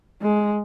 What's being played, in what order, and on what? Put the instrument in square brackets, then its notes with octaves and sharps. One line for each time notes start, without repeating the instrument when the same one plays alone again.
[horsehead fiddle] G#3